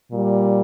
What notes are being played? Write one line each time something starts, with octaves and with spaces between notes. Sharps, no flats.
A#2 G3